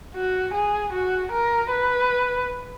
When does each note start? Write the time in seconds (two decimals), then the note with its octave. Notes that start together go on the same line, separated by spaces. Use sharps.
0.15 F#4
0.54 G#4
0.93 F#4
1.32 A#4
1.71 B4